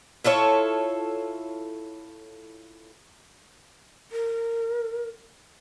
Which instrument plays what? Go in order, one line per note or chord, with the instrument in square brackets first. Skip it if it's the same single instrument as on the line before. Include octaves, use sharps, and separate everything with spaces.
[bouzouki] E4 F4 A4 C#5
[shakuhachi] A#4